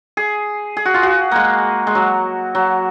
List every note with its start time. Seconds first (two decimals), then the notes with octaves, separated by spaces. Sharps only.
0.17 G#4
0.77 G#4
0.85 F#4
0.94 F4
1.03 F#4
1.31 G#3 A#3
1.87 G#3
1.95 F#3
2.55 F#3